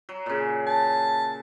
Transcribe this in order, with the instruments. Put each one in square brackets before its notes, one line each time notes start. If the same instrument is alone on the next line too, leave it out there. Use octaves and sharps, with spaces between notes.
[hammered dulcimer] F#3
A#2 C#3
[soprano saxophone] A5